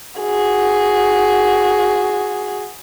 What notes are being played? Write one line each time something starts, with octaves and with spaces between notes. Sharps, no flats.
F#4 G#4